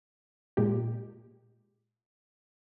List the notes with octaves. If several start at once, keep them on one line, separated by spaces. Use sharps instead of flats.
A#2 G#3 G4